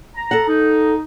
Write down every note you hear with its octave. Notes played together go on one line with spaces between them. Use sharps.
A#5
A4 F#5
D#4